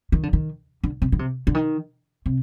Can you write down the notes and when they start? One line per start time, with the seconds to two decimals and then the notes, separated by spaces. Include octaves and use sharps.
0.12 D#3
0.23 D3
0.33 D#3
0.84 D3
1.02 C3
1.12 D3
1.19 C3
1.47 D3
1.54 D#3
2.26 C3